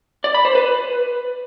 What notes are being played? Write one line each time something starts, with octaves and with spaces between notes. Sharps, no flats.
D5
B5
C5
B4